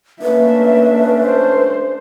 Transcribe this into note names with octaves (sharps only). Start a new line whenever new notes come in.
A3 A#3 C#4 D4 B4 E5
C5